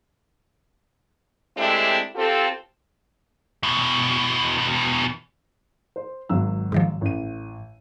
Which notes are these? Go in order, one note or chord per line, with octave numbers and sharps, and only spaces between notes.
G#3 A3 C4 D4 E4 G4
C4 F4 G4 A4
E2 B2
C5
G#1 F#3 E6
G#2 D#3 F3
A1 D#7